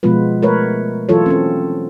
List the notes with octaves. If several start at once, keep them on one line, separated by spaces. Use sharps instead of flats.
B2 F3 G#3 B3 F4 B4
A3 A#4 B4 C#5
E3 F#3 F4 A4 C#5
C4 C#4 A4